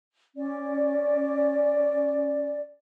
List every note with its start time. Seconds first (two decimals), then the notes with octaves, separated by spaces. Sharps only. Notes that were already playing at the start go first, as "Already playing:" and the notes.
0.36 C#4 D5